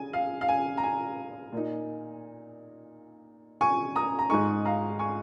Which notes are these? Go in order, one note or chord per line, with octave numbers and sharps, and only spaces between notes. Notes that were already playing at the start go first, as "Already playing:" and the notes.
Already playing: C#3 G#5
F5
F5
G#5
A#5
G#5
A#2 A#3 D#4
G#5 C#6
A#5 D#6
A#5
G#2 G#3 D#4 G#5 C#6
F5 A#5
G#5 C#6